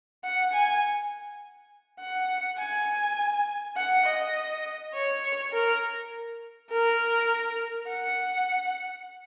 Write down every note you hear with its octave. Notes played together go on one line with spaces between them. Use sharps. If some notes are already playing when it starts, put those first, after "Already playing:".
F#5
G#5
F#5
G#5
F#5
D#5
C#5
A#4
A#4
F#5